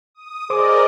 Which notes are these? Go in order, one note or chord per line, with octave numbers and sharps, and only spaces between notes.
D#6
G#4 A#4 C5 D5 D#5 D6